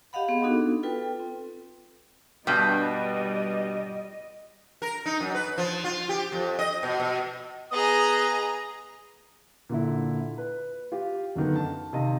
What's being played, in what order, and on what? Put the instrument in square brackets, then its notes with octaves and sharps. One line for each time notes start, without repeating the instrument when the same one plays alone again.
[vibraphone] G4 D#5 F5 F#5 B5
B3 C4 G#4
B3 D4 D#4 F#4 A4
F4 A4 B4 G5
C4
[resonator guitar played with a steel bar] G2 B2 [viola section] G3 [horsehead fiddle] D#5 [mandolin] G5
[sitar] A#4
D#4
F#2
B4
F3
F4
G4
F2
D#5
B2
B2
[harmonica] B3 D#5 D#6 [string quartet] G#4 A#5
[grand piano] A#2 D3 E4
B4
F4 G4
F#2 D3 D#3 B3
A5
C3 D#3 D#5 F5